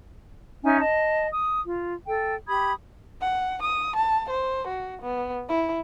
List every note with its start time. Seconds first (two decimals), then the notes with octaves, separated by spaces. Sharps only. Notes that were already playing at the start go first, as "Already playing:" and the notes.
0.63 C#4 D#4 E5 G#5
0.79 D#5 A5
1.32 D#6
1.65 F4
2.06 A4 G5
2.47 G4 B5 D#6 G#6
3.21 F#5
3.63 D#6
3.96 A5
4.30 C5
4.68 F#4
5.02 B3
5.48 E4